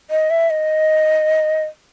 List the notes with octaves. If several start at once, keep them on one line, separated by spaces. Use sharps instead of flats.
D#5
E5
D#5